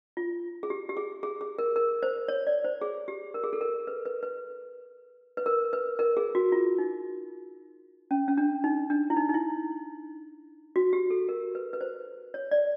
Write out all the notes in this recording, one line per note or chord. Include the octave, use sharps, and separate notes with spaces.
F4
G#4
G4
G4
G#4
G#4
G#4
A#4
A#4
C5
C#5
D5
C5
G#4
G4
A#4
G#4
A4
A#4
B4
B4
B4
B4
A#4
B4
A#4
G#4
F#4
F4
D#4
C#4
C#4
D4
D#4
D4
E4
D#4
D#4
E4
F#4
G4
A4
A#4
B4
B4
C5
C#5
D5